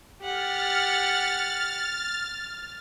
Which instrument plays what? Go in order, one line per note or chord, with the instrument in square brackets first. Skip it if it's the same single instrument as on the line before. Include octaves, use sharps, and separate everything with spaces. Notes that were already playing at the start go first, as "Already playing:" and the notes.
[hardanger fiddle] G4 F#5 [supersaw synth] F6 A6